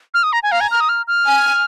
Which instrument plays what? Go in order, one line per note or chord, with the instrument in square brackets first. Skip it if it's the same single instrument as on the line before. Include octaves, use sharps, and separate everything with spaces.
[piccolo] F6
D#6
A#5
G#5
[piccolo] F5 [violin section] A#5
[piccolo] G#5
F6
D#6
F6
F6
[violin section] G#5